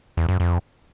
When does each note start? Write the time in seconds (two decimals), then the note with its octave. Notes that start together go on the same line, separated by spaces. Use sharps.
0.17 E2
0.29 F#2
0.40 F2